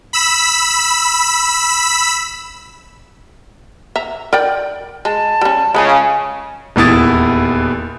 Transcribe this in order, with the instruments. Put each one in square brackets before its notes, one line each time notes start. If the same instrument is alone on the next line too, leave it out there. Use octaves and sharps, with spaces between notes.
[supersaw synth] B5 E6 B6
[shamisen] E5 A#5
A#4 D5 G5
[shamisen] G#3 [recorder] A5
[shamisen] G3 C#4
[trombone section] C#3 [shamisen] G#3 C#4 F4 [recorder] G#5
[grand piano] D#1 E2 E3 E4 D#6 A6